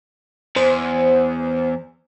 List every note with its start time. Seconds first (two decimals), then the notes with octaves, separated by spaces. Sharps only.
0.56 E2 C5